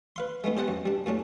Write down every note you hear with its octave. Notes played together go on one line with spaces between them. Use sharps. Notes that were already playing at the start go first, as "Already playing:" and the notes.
B4 F5 C6
G#3 A3 B3 D#4
G4 C5 D#5 F#5 A5
F#2
G3 D4
F#2 A2 C#4 D4